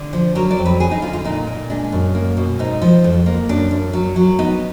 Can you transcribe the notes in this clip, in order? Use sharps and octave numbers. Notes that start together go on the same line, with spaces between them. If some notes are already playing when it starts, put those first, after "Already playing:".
Already playing: D3
F3
F#3 A#4
D5
F2
B4
B3 G#4
D#4
D3 F4
F4
A#2 D#4
A#2
G#3 D4
F#2
A#3
B2
G#2 D#4
F3
F2
A#3
F#2 D4
F#2
F#3
F#3
B3 D#4